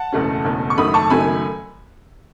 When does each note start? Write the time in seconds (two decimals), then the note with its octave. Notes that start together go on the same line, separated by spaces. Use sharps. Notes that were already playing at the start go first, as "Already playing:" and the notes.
Already playing: F#5 A5
0.12 F#1 E2 B2 A3 C#4
0.45 F#1 E2 B2 A3 C#4
0.70 C#6
0.78 F#1 F#2 D#3 F#3 A3 B5 D#6
0.94 A5 C#6
1.10 F#1 F#2 D#3 F#3 A3 G#5 B5